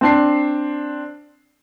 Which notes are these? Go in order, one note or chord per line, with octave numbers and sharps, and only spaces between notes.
C4 D4 C7